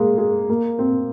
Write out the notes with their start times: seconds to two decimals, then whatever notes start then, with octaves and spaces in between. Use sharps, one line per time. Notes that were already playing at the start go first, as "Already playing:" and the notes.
Already playing: G#3 A#3
0.18 G#3
0.49 A#3
0.79 C4